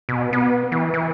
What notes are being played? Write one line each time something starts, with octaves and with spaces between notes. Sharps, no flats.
B2
B3
E3
E3